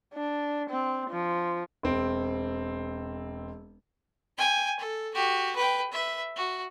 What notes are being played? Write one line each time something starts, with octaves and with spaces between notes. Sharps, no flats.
D4
C4
F3
E1 C4 D7
G5 G#5
A4
F#4 G4
B4 G5
B4 E5
F#4